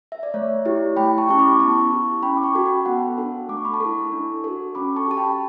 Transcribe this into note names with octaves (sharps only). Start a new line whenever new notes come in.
E5
D5
A3 C#5
E4 G4
A3 G5 B5
A5 C#6
C#4 E4 G4 C#6
B5 D6
B3 A5 C#6
E4 G4
C#4 G5 B5
D6
A5 C#6
F#4 A4
G5 B5
B3 F#5 A5
D4 A4
A3 D6
C#6
B5
A5 C#6
E4 A4
D4
F#4 A4
C#4 B5 D6
A5 C#6
G4 A5
G5 B5